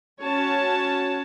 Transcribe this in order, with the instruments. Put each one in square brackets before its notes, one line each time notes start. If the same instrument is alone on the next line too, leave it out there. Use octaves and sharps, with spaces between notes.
[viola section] C#4 F#4 C#5 A5